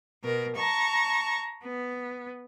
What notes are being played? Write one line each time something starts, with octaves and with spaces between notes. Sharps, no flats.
B2 A#4
A5 A#5 C#6
B3